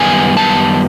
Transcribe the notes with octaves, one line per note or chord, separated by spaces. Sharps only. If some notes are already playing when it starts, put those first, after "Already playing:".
Already playing: F#2 D#3 G3 B3 G#5
A5